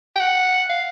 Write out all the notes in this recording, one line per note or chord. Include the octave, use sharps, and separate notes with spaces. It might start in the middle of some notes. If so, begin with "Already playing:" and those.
G5
F#5
F5